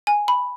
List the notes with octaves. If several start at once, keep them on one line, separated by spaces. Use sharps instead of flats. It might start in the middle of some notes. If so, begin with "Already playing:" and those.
G#5
B5